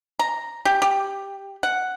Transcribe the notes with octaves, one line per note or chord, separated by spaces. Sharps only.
A#5
G4
G4
F#5